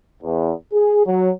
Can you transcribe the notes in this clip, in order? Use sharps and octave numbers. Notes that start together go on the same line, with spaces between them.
E2
G#4
F#3